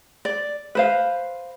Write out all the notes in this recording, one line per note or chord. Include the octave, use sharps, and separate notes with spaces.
D5
B4 C5 F5